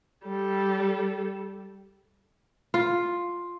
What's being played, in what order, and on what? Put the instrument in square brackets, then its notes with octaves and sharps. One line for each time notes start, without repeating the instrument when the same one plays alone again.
[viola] G3 A4
[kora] F4